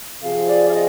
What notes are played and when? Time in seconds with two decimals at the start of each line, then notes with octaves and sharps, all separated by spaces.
0.22 C3 F3 C4 F4 G#4 F5
0.48 D5
0.68 F5
0.73 D#5